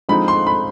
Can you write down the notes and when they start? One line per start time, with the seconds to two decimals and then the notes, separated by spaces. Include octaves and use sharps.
0.09 D3 F3 G#3 C4 D#4 B5
0.28 C6
0.47 B5